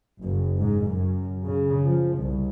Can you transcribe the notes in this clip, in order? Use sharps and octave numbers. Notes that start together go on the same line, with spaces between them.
F#1
G#2
F#2
C#3
F3
C2